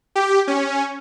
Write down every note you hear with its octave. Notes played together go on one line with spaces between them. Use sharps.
G4
C#4